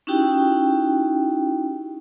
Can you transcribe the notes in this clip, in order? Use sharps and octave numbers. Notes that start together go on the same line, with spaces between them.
C#4 D#4 E4 F#4 G4 G5